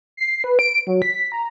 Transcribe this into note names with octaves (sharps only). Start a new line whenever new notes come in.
C7
B4
D7
F#3
B6
A#5